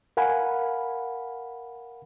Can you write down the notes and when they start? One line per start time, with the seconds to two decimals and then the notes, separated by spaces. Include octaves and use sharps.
0.17 A#4 F5 F#5 G#5 B5